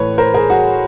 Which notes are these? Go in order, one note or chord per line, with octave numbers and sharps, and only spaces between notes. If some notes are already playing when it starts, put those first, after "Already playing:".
Already playing: A2 E3 A3 B4 C#5
A#4 C5
G#4 A#4
F#4 G#4